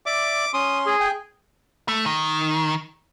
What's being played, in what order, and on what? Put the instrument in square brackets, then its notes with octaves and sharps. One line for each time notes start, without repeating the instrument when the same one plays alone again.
[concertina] D5 E5 [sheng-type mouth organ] D6
[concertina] C#4 C6 [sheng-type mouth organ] D#6
[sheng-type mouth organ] G#4
[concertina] G5 G#5
[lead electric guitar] A3
D#3